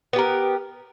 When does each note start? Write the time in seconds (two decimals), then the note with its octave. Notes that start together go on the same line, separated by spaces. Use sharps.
0.13 B3
0.16 G4
0.19 A#4